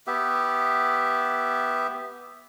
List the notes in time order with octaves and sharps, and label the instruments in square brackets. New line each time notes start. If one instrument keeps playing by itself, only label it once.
[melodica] B3 G4 E5